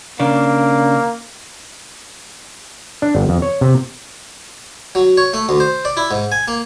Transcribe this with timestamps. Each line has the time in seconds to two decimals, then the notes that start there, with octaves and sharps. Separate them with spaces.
0.20 C#3 A#3 D4
3.02 D4
3.15 G1
3.29 F2
3.42 C#5
3.61 C3
4.95 F#3
5.17 C#5
5.34 A3
5.49 D2
5.60 C5
5.85 D5
5.97 E4
6.11 G#2
6.32 G#5
6.48 A#3